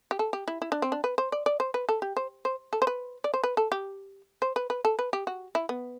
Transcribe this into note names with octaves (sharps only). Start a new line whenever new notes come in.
G4
A4
G4
E4
E4
D4
C4
D4
B4
C5
D5
D5
C5
B4
A4
G4
C5
C5
A4
C5
B4
D5
C5
B4
A4
G4
C5
B4
B4
A4
B4
G4
F#4
E4
B3